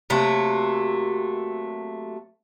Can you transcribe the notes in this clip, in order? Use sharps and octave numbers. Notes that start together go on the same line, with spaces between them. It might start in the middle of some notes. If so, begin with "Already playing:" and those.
C3 F#3 A3 A#3